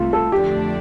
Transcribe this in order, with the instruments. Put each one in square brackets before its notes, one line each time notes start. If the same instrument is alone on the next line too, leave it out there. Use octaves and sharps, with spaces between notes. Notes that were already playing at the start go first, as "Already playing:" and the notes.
Already playing: [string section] C2 C3 A3 [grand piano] F4
[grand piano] A4
[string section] F2 D3 A3 D4 [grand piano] G4